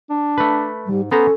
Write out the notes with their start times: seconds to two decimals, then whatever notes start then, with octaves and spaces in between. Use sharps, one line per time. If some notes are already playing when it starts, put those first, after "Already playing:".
0.10 D4
0.38 A3 B4
0.86 G#2 G3
1.11 B3 C#4 A4 C5 A#5